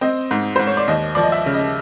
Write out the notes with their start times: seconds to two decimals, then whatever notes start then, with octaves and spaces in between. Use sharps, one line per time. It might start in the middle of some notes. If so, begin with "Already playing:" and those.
0.01 C4 D#5
0.31 G#2
0.56 G#2 C5
0.67 C#5
0.77 D5
0.88 D#2 D#5
1.15 F3 D5
1.23 D#5
1.32 E5
1.46 C#3
1.54 D#5